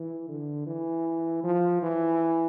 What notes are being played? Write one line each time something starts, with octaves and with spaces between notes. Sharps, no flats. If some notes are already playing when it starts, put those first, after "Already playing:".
Already playing: E3
D3
E3
F3
E3